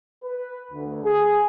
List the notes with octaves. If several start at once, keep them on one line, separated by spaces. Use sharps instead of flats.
B4
D2
G#4